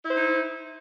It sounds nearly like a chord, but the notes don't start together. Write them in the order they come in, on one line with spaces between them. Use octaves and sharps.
E4 C5 D#4